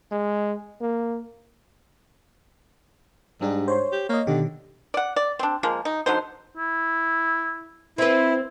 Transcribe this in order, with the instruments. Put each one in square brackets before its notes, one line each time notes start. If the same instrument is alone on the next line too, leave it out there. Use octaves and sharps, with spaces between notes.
[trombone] G#3
A#3
[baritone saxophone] G#2 [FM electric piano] G3 D4 G4
[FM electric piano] C5 C#5 C6
[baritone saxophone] G4
[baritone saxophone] A#3 [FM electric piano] C#5 D#5
[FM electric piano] B2 D#3 G4 [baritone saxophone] D3
[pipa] D5 F#5
D5
C4 D4
F3 G#3 A#3
D#4
D3 F#3 D#4 C5
[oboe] E4
[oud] C4 B4 [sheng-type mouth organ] E4